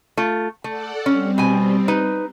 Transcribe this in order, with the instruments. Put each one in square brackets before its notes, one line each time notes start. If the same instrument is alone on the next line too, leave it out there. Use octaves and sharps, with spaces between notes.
[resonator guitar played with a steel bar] A3 F4
[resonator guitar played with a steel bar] A3 [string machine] A4 D5 F#5
[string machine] G3 C4 [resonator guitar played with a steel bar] C#4
[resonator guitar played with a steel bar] B2 G#5
D#4 B4